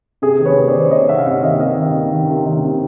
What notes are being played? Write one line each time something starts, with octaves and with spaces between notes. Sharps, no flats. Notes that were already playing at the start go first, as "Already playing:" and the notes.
C3 G#4
D#3
B4 C#5
C3
C5 D5
D#3
C3 C#5 D#5
D#3 E5 F#5
F5
C3 E5 F#5
D#3 D#5 F5
C3 D#5 F5
D#3
C3
D#3
C3
D#3
C3